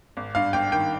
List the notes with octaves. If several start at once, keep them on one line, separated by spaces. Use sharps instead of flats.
G#1
G2 F5
G#1 G5
D#3 G5